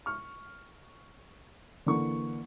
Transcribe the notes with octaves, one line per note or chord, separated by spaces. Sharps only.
C#6 F6
D3 E3 A#3 C#6